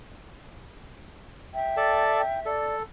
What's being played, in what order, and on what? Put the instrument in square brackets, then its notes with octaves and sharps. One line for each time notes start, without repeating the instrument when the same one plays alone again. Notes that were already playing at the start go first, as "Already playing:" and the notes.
[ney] E5 [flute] G5
[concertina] A4 D5 A5
[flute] G5
[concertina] A4 [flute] D5